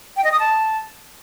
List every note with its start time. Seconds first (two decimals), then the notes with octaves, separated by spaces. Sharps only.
0.17 G5
0.24 D#5
0.32 D#6
0.40 A5